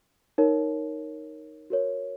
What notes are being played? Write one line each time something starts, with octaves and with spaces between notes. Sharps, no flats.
D#4 A#4 C#5
F#4 A#4 C#5